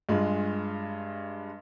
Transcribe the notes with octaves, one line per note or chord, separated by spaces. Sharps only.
G2 G#3 F4